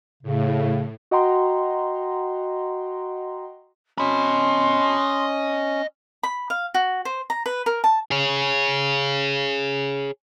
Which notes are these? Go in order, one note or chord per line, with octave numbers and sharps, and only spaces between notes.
A2 C#3
F#4 D#5 F#5 G5 A#5 C6
C#4 D#5 B5 C6
B5
F5
F#4
C5
A#5
B4
A#4
A5
G#4 C#5